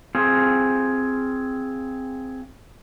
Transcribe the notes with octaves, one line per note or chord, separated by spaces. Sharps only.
C4 F4 G#4